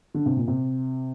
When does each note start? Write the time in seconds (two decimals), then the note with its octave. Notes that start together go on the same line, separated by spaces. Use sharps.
0.14 D3
0.26 C3
0.37 A#2
0.48 C3